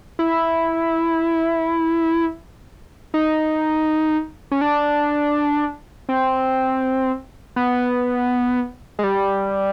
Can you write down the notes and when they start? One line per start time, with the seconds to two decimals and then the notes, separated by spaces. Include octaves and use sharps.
0.19 E4
3.14 D#4
4.51 C#4
4.61 D4
6.09 C4
7.56 B3
8.99 G#3
9.04 G3